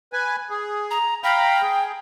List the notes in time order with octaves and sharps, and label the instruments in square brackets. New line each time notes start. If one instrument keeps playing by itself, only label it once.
[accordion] B4 G#5
G#4
[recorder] A#5
[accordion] F5 A#5 B5 [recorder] G5
[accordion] G#4